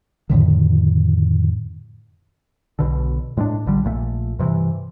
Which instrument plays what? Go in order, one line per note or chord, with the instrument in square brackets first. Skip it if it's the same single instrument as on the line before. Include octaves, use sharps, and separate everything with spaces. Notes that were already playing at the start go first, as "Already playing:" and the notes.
[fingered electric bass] F2 A2 D3 D#3
[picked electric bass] B1 B2 D3
A2 G#3 C4 D4
A#1 D3 G3
A#1 A#2 A3
G2 C3 D#3 E3